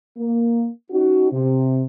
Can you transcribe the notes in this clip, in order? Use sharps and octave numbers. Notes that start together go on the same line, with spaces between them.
A#3
C#4 D#4 F#4
C3